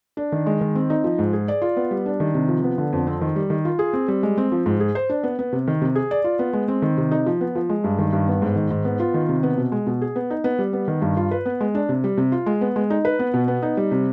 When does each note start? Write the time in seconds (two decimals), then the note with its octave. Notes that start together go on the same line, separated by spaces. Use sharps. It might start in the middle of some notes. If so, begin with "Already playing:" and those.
0.17 D4
0.32 D#3
0.46 G#3
0.61 D#3
0.75 C4
0.90 D#4
1.04 F3
1.19 G#2
1.33 G#4
1.48 D5
1.62 F4
1.77 B3
1.91 G3
2.06 D4
2.20 D#3
2.34 C3
2.48 F3
2.63 B3
2.78 D3
2.93 F2
3.07 C4
3.21 D#3
3.36 G3
3.50 D#3
3.65 F4
3.79 G#4
3.93 C4
4.08 G3
4.23 G#3
4.38 C4
4.52 F3
4.66 G#2
4.80 G#4
4.95 C5
5.09 D4
5.23 B3
5.39 B3
5.53 C3
5.67 D#3
5.81 C3
5.95 G#4
6.11 D5
6.24 F4
6.39 B3
6.53 G#3
6.68 C4
6.82 D#3
6.97 C3
7.11 D#4
7.26 F3
7.41 B3
7.55 F3
7.69 G#3
7.84 G2
7.98 D#3
8.13 G2
8.28 B3
8.42 G#2
8.56 D#3
8.71 G#2
8.85 B3
9.00 F4
9.14 D#3
9.29 C3
9.43 B3
9.57 B2
9.72 G#3
9.87 B2
10.01 G#4
10.16 B3
10.30 D#4
10.44 B3
10.59 G3
10.73 B3
10.88 D#3
11.02 G2
11.17 F4
11.31 B4
11.46 B3
11.60 G#3
11.75 D4
11.89 C3
12.04 G3
12.17 C3
12.32 F4
12.46 G#3
12.61 B3
12.76 G#3
12.90 D#4
13.05 B4
13.19 B3
13.34 B2
13.48 B3
13.62 D#4
13.77 G3
13.91 C3